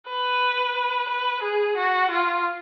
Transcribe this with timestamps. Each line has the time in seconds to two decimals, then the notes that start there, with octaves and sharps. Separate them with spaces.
0.08 B4
1.09 B4
1.43 G#4
1.77 F#4
2.11 F4